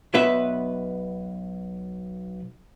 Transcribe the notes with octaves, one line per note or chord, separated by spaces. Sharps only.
B1 B3 B4 E5